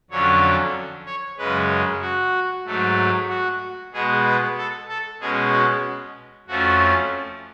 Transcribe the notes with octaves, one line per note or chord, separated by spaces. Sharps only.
F2 D3 F#3 C#4 C#5
C#5
F#2 C#3 G#3 B4
F#4
G#2 F#3 A3
F#4
B2 G#3 B3 G#4
B4
A4
A4
B2 G#3 C#4 G#4
F#4
F2 F3 A3 C#4 F#4